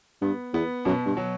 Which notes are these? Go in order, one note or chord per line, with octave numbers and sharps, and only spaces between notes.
G2 B3
E2 B3
F#2 B2
G2
F#3